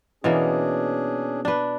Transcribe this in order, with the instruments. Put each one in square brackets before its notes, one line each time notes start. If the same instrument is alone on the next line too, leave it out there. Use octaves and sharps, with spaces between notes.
[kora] B2 E3 A#3 [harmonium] C#4 D4 G#4
[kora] D4 B4